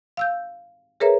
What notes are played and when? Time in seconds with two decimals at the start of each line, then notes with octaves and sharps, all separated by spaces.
0.17 F5 E6 G6
1.00 G#4 A#4 B4 C#5 E5 A#5